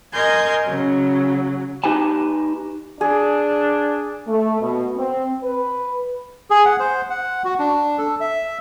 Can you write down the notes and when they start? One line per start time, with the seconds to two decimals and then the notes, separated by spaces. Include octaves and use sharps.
0.14 A#4 D#5 G#5 C6 G6 G#6
0.66 C#3 F#3
1.84 D#4 G4 B4 G#5 A5
3.01 D4 G#4
4.28 A3
4.61 B2
4.97 C4
5.43 B4
6.50 G#4
6.65 F#5
6.80 C5
7.10 F#5
7.45 F#4
7.59 D4
7.98 A4
8.21 E5